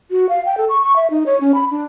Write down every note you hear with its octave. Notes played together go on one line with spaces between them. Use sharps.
F#4
F5
G5
A4
C#6
C#6
E5
D#4
C#5
C#4
B5
D4